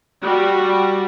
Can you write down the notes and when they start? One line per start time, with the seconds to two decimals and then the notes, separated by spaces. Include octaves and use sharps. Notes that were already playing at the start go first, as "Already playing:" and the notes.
0.23 G3 F#4